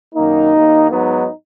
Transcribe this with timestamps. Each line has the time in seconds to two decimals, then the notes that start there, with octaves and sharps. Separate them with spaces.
0.14 F#2 D#3 A#3 D#4
0.53 D#2 D#3 A#3
0.91 G#2 F#3 B3 D#4